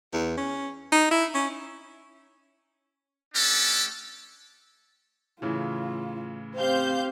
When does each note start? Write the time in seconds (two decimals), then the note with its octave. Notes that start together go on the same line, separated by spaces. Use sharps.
0.13 E2
0.37 C#4
0.92 D#4
1.11 E4
1.34 C#4
3.34 A3 C#4 D4 G4 A4
5.42 A2 C#3 E3 F4
6.57 C4 G4 C5 F5 G6